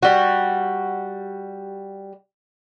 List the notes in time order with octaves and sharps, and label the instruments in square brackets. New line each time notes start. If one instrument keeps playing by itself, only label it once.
[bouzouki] G3 F#4